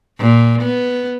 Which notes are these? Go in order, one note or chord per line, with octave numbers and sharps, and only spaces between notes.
A#2
B3